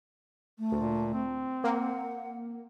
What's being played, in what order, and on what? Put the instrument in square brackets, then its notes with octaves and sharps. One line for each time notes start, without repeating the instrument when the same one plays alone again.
[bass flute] A3
[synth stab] D2 [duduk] A#2
[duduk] C4
[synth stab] A#3 [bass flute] F#5